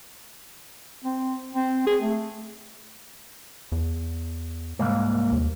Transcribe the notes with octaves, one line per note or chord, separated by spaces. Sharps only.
C4
C4
G#4
A3
E2
C2 G#2 A#3
D#2